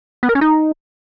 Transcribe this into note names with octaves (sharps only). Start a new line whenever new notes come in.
B3
A#4
C#4
D#4